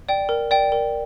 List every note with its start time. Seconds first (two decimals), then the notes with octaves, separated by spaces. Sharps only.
0.09 D5 G5
0.29 A#4
0.51 D5 G5
0.72 A#4